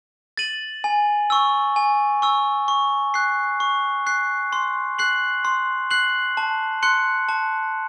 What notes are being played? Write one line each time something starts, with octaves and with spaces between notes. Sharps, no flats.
A6 D#7 F#7
G#5
C#6 E6
G#5
C#6 E6
C#6
F#6 C7
C#6
F#6 C7
C6
F#6 C7 F#7
C6
F#6 C7 F#7
A5
C6 F#6 C#7
A5